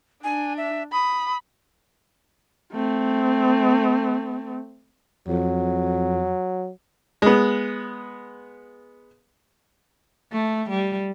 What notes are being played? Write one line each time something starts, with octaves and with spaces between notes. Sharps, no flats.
D4 G#5
E5
B5 D#6
A3 C4
F2 F#3
G#3 B3
A3
G3